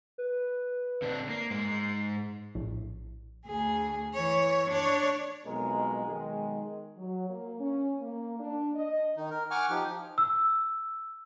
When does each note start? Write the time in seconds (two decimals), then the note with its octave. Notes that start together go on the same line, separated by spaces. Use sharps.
0.18 B4
1.02 D3 C4 D4
1.29 A#3 C7
1.51 G#2 G#3
2.55 A#1 A2
3.46 D2 G#4
4.13 E3 C#5
4.70 D4 C#5
5.45 B1 F2 B2 G#3 A#4
6.07 B1 D#3 G#3
6.97 F#3
7.29 A#3
7.60 C#4
8.01 A#3
8.39 D4
8.75 D#5
9.17 D#3 D#4
9.31 A#4
9.51 F#5 G#5 C#6 D6 F6
9.70 F3 D#4 G4
10.18 E6